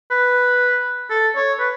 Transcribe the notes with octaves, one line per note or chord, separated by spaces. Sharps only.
B4
A4
C#5
B4